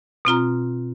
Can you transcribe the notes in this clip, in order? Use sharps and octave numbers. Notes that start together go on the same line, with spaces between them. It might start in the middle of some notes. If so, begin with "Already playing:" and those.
B2 C4 F4 A#5